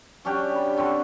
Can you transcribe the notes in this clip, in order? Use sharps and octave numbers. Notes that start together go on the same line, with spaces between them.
F#3 C#4 D4 G4
B5
D3 C4 F#4 A4